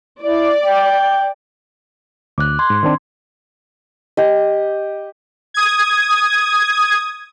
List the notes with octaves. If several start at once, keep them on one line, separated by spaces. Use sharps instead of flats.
E4 D5
G5
D2 D6 F#6
C6 G#6
G#2
D#3 C4 D4
G4 D#5
D#6 G#6